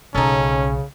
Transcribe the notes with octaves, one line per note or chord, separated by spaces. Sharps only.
B1 C#3 G#3 C#4 D#4 A4